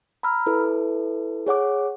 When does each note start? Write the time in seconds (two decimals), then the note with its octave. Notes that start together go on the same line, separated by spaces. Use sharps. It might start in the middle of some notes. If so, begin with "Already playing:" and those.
0.23 A#5 B5 E6 F6
0.46 E4 A4 B4 E5
1.47 G#4 C#5 F#5 D6